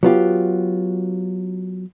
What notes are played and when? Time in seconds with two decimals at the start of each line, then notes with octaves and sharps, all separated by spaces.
0.03 F#3 B3 F4 G4